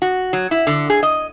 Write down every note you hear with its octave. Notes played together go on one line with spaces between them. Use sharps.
F#4
F#3
E4
D3
G#4
D#5